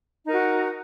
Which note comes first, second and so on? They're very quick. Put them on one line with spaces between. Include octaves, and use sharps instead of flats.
D#4 A#4 F#4